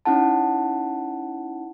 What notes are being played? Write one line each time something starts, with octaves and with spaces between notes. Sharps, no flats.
C#4 D#4 E4 F#5 A5